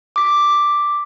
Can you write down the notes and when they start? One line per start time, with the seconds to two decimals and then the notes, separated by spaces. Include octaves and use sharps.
0.16 D6 B6